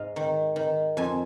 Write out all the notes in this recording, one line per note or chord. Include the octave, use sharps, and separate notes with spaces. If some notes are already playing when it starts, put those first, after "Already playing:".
Already playing: G#2 D#5 F5
D#3
D#3
F2 G#5